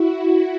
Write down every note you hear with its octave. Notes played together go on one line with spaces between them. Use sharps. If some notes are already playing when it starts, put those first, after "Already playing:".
Already playing: E4 F#4